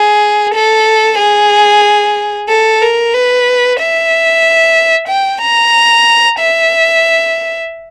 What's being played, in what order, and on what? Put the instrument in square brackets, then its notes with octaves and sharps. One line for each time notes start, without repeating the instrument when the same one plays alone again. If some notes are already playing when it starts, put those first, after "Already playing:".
Already playing: [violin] G#4
A4
G#4
A4
A#4
B4
E5
G5
A#5
E5